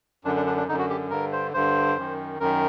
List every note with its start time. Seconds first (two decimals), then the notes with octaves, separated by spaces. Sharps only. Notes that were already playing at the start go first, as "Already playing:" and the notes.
0.25 F#2 D3 D4
0.36 D4
0.46 D4
0.57 D4
0.68 D3 D#4
0.72 F#2
0.79 F#4
0.90 G4
1.10 G2 D3 A#4
1.32 C5
1.54 G2 D3 C5
1.97 F#2 D#3
2.40 F#2 D#3 A#4